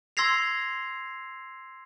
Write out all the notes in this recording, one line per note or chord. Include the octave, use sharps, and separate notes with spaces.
C6 E6 G#6 A#6 C7 F7